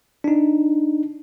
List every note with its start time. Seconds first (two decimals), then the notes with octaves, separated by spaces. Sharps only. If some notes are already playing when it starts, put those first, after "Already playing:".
0.24 D4 D#4